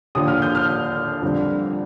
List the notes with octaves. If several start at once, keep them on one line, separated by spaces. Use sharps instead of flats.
D#2 D3 F3 D#6
F6
G6
F6
F2 D3 G3